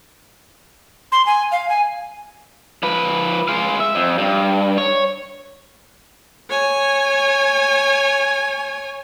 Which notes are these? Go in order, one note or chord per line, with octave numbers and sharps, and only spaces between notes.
C6
G#5
F5
G#5
F3 B4
G#3 F5
E5
F2
G2
C#5
C#5 G#5